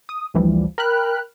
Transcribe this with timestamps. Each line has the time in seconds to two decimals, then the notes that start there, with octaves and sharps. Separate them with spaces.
0.09 D#6
0.34 A1 D2 E3 F3 G3
0.78 A#4 G5 B5 F6 F#6